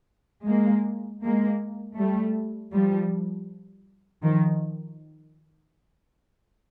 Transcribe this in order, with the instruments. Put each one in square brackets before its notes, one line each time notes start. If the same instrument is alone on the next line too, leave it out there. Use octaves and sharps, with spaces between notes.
[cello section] G#3 A#3
G#3 A#3
G3 A3
F3 G3
D#3 F3